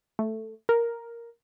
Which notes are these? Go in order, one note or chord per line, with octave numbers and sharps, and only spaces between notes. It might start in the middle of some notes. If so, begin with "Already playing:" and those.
A3
A#4